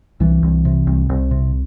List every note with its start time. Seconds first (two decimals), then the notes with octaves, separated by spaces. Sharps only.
0.20 C2 E3
0.43 C2
0.65 C3
0.87 C2
1.09 C2
1.31 C3